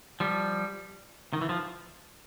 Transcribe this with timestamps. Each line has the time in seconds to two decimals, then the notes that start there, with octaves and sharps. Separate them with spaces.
0.20 F3 G3
1.33 D#3
1.41 E3
1.49 F3